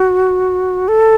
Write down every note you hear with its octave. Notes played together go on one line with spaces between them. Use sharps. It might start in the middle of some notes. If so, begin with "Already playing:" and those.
Already playing: F#4
A4